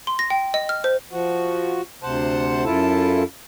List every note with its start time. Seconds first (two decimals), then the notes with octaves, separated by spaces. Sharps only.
0.07 C6
0.19 A#6
0.30 G5
0.54 D#5
0.69 F6
0.84 C5
1.11 F3 F#4
2.03 D2 C3 C5 F#5 A5
2.65 F#2 E4 F4 A4 A5